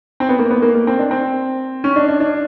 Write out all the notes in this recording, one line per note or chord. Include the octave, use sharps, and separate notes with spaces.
C4
B3
A#3
B3
A#3
A#3
C4
D4
C4
C#4
D4
D4
D4